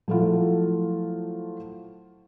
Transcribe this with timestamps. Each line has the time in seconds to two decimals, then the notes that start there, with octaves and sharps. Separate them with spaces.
0.08 F3 F#3 A3 E4 F4